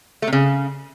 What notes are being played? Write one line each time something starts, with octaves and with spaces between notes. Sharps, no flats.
A3
C3
C#3